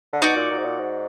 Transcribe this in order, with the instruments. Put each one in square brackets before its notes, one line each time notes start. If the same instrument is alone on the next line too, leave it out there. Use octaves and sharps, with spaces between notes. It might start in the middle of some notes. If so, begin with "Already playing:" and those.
[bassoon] D3
[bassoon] B2 [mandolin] D#4 F#4 D5
[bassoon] A#2
A#2
G#2
A#2
G#2